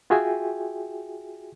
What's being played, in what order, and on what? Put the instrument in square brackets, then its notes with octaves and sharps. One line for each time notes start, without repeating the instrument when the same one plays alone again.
[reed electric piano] F4 F#4 G#4 E5 G5 G#5